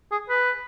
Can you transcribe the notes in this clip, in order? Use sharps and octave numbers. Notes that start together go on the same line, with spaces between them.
G#4
B4